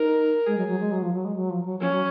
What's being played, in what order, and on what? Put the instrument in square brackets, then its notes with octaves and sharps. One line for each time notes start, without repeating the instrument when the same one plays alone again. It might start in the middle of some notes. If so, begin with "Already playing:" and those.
Already playing: [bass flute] D#4 [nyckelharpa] A#4
[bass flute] G#3 [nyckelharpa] G#4
[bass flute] F#3
F#3
G#3
F#3
F3
F#3
G#3
F#3
F3
F#3
[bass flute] F3 [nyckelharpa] C#4
[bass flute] F#3